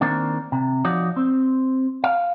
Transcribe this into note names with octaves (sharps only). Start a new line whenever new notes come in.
D#3 A#3 C4 D4
C3
F3 D#4 F#4 C#5 D5
C4
F5